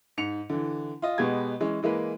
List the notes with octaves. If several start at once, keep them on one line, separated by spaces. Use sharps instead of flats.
G#2 C#7 F7
D3 E3
F4 D#5
B2 G#3 B3 G4 G#6
E3 G#3 C#4
E3 G#3 A#3 B4